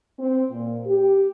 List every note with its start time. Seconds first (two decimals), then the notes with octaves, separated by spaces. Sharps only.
0.19 C4
0.51 A#2
0.86 G4